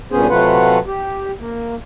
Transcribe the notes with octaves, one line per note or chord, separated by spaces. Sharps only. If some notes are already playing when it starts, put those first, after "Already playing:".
G2 A#2 B3 C#4 G#4 C5
C3 F#3 A3 F4 B4 F#5
G4
A#3